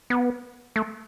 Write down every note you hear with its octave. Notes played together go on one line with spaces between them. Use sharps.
B3
A3